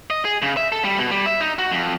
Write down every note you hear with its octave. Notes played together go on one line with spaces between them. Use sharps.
D#5
G#4
C#3
E5
A4
G3
B2
G3
E5
D#4
F#4
F2